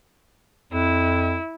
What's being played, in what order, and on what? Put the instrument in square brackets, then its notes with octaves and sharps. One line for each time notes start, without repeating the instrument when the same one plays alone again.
[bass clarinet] F2 [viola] E4